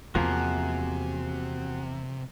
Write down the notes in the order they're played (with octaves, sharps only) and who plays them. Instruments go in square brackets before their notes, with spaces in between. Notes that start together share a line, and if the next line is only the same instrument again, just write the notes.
[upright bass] E2 [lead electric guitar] C3 [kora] F3 A#3 [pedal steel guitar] F#4 G#4 F#5